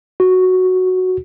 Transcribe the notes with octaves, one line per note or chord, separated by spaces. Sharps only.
F#4